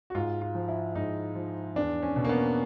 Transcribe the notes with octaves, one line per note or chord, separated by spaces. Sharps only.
F#4
G#2 F4
F4
F3
E4
G#2 D#4
F3
E2 D4
C#4
B2
A#3
B3